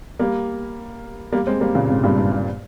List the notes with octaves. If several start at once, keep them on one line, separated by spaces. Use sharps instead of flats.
G3 A#3
G3 A#3
G#3 C4
G3 A#3
A#2 C#3
G#2 C3
G2 A#2
G2
G2